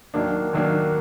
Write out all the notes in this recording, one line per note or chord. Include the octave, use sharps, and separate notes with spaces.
D#2 D#3 F#3 A#3 D4
D#2 D#3 F#3 A#3 D4